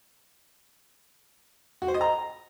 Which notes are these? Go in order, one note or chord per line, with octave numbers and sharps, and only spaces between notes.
F#4
C5
D#5
A#5